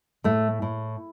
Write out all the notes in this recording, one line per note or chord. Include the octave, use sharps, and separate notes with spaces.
A2 A3
A2